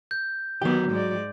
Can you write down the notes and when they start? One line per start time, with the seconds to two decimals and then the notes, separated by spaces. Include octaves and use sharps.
0.11 G6
0.62 D#3 F#3 B3 G4
0.90 G#2 G#3 D5